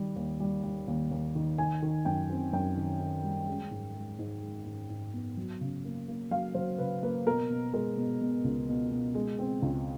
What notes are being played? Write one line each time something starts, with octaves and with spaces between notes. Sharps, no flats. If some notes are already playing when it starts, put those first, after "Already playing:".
Already playing: D#3 G3
D#2
G3
G3
D#2
D#2
D#3
D#3 G#5
D#3
F#2 G5
C4
F#2 G5
D#3
D#3
G3
G#3
G#2
G#3
G#2
G#3
G#2
G#2
B3
F#3
C#3
A#3
A#3
F#3 F5
F#3 C5
C#3 B4
A#3 B4
B2 A#4
B2
G#3 A#4
B2
B2
C#2
B2
B2
G#3
C4
C#2